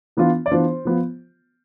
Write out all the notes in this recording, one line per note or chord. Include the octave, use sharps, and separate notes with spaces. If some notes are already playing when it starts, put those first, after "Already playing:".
E3 B3 D4 F4
D5
E3 B3 D4 F4 C5
F3 B3 F4